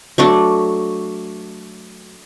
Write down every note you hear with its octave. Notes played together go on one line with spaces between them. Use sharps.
F#3 A3 D4